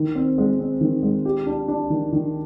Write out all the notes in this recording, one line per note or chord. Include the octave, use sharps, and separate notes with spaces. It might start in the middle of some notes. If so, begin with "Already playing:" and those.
Already playing: D#3
C4
G#3
C4
D#3
G#3
G4
D4
D4
D#3
D#3